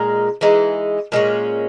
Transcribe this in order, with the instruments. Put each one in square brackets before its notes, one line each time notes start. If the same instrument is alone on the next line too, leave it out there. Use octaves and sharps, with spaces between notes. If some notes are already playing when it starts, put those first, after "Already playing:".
Already playing: [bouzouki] A#2 G#3 D#4 A#4
E3 G#3 D#4
A#2 G#3 C#4